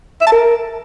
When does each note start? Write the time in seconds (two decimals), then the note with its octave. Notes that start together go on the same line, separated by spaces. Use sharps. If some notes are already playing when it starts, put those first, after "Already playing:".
0.21 E5
0.26 A5
0.32 A#4